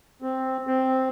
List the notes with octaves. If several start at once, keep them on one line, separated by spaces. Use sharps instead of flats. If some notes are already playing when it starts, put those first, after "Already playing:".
C4
C4